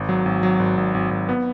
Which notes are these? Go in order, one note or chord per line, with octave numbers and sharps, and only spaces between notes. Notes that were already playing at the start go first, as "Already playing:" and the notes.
Already playing: G#1
F#3
G#1
F#3
G#1
G#1
G#1
G#1
B3